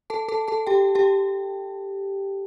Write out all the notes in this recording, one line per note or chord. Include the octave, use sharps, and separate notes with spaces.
A4 A5
A4 A5
A4 A5
G4 G5
G4 G5